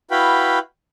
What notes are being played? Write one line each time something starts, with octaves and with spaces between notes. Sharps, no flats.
E4 F#4 B4 F5 G5 B5